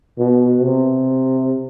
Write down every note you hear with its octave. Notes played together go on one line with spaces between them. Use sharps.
B2
C3